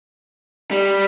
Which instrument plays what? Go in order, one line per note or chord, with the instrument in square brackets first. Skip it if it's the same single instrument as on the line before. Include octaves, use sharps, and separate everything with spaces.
[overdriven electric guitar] G3